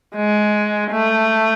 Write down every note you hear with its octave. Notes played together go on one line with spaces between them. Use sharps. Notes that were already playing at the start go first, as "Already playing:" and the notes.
G#3
A3